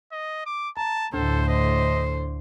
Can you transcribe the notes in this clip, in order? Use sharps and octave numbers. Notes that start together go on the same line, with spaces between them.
D#5
D6
A5 A#5
D2 A2 D3 A4 C5
C5 D#5